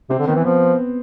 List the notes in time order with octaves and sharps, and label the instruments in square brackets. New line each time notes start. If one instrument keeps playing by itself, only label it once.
[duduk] C3 [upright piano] C4
[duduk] D3
[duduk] D#3 [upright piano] B3
[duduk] E3
[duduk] F3 [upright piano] B3